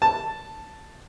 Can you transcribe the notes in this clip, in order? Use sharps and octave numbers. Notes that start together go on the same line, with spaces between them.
A5